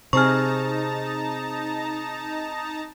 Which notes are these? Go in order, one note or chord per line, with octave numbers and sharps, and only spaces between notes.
C3 C4 D#4 G#4 A5 A#5 C#6 F6